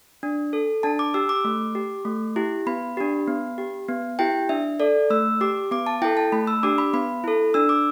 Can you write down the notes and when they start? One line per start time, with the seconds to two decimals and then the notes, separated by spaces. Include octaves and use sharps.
0.23 D4
0.53 A4
0.83 D4 A5
0.99 D6
1.14 G4 E6
1.29 D6
1.45 A3
1.75 G4
2.05 A3
2.36 E4 G4
2.66 B3 B5
2.97 D4 G4
3.28 B3
3.58 G4
3.89 B3
4.19 E4 G4 G5
4.49 D4 E5
4.80 A4 D5
5.10 A3 E6
5.41 G4 D6
5.71 B3 D6
5.86 A5
6.02 E4 A4 G5
6.17 A5
6.32 A3 B5
6.47 E6
6.63 D4 G4 D6
6.78 B5
6.93 B3 B5
7.24 E4 A4
7.54 D4 E6
7.69 D6